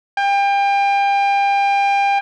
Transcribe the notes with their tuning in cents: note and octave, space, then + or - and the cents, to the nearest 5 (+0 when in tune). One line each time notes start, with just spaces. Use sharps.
G5 +30